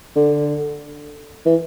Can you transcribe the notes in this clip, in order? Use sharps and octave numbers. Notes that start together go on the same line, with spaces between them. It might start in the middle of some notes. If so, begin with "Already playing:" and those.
D3
E3